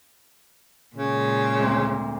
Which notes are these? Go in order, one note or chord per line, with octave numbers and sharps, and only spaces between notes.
A#2 C#3 G#3
D2 G#2 C4